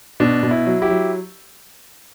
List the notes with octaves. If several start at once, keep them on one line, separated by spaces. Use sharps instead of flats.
B2 D4
B2
E4
F#3
E4 G4
F#3